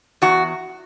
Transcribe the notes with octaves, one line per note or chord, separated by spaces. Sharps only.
E2 F#4